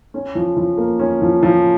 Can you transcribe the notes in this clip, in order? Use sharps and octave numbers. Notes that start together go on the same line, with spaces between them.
C#4
F3
F3
A#3
C#4
F3
F3